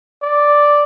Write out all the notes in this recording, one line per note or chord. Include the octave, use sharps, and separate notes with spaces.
D5